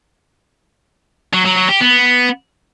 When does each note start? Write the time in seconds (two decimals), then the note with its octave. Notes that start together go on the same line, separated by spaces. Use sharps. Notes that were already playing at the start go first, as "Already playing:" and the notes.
1.33 F#3
1.45 F#3
1.57 F#3
1.69 G4
1.81 B3